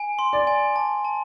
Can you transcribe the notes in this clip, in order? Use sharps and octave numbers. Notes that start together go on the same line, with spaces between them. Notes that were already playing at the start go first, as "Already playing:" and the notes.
Already playing: G#5
C6
D5
G#5
A5
A5